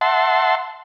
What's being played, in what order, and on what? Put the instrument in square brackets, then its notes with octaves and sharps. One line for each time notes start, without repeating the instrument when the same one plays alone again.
[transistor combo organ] E5 F#5 A5 C6